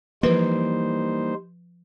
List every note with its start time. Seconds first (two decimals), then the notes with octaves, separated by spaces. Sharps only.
0.23 E3 F3 G3 A#3 D#4 B4 C5